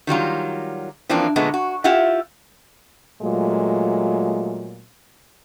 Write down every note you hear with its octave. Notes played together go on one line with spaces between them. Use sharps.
D#3 F#3 G3 F4
E3 F3 A#3 C4 D4
A#2 D3 G#3 A3 B3
F#4
E4 F4 G4 E5 F#5
A#2 F#3 G#3 A3 F4